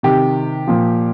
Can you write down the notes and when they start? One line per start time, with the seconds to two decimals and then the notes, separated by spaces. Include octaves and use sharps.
0.03 C3 D#3 G4
0.67 A#2 F3